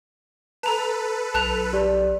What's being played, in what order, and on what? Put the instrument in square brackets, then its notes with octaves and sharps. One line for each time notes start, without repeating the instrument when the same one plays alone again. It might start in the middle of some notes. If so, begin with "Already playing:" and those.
[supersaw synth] A4 B4 [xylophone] A5 A#5
[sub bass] B1 [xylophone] A5 F#6 F7
[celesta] G4 D5